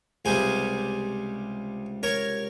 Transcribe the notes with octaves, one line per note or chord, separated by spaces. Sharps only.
C#2 C3 G3 G#4 C5
A#4 C#5